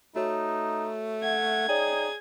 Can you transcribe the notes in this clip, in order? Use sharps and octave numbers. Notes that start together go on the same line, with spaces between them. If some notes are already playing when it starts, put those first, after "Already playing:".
A3 D#4 F#4 C#5
E5 F#5 G#6
D#4 G#4 C#5 D5 G5